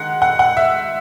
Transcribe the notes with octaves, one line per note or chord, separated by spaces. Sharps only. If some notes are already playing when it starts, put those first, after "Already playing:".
Already playing: D#3 G#3 F#5
F#5
F#5
E5